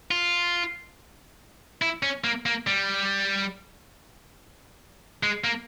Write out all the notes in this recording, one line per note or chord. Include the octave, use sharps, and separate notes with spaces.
F4
E4
C#4
A#3
A#3
G3
G#3
A#3